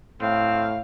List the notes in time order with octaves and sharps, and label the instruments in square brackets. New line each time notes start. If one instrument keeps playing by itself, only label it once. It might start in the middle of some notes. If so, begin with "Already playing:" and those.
[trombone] A2 [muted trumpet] C4 [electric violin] F5